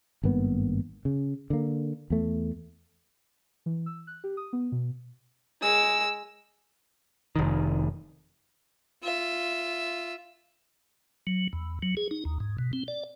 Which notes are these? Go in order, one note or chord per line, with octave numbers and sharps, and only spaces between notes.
G#1 G2 A#3 B3
C#3
D3 A#3
E2 A3
E3
E6
F#6
G4
D#6
B3
B2
G#3 E6
F1 D#3
F4 E5
F#3
E2
F#3
G#4
D#4
D#2
G#2
B2
C4
D5